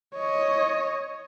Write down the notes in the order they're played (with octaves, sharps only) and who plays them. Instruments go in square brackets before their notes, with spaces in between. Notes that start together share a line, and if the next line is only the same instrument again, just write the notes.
[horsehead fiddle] C#5 D#5